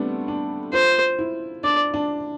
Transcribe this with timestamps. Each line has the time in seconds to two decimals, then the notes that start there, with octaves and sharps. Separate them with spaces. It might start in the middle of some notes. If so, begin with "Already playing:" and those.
Already playing: G3 A3 B3 C4 D4
0.28 D4
0.73 F4 C5
1.19 E4
1.64 D4 D5
1.94 D4